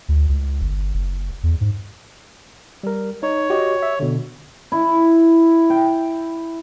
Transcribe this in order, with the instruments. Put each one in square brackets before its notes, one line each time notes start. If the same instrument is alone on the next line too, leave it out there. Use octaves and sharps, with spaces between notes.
[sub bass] D2
C#2
G1
F#1
E2
G#2
[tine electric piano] G3 A#4
[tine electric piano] D#4 [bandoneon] C#5
[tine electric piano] F#4 G4 D#5
E5
B2 D3
[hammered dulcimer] E4
G5